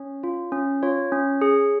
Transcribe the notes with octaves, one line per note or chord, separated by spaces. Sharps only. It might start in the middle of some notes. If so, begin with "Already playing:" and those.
Already playing: C#4 C#5
F4
C#4
F4 C#5
C#4
G#4